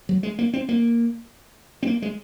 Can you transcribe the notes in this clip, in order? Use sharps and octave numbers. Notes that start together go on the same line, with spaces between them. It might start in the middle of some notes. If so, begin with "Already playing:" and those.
F#3
G#3
A#3
C4
A#3
C4
A#3
G#3